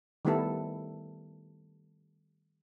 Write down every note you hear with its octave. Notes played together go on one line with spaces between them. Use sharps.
D#3 G3 A3 B3 E4 A4